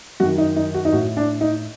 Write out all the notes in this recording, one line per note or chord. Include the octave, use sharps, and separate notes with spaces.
F#2 D#3 F#4
D#4
D#4
F#4
D#4
A2 F#4
D4
D#4